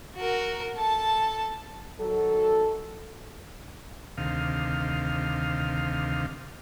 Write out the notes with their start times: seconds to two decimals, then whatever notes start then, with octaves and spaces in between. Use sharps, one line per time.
0.16 F#4 A#4
0.77 A4 A5
2.00 D#3 F#3 F#4 A4
4.17 D2 C3 D#3 F5